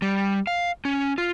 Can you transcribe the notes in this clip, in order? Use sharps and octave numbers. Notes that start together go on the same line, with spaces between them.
G3
F5
C#4
F4